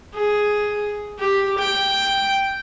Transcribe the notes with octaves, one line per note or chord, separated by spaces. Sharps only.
G#4
G4
G5